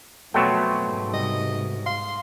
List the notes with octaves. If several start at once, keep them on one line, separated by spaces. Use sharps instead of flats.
F2 B2 F#3 A3 G5 C6 E6
G#2
C3 G3 D#5
F5 C6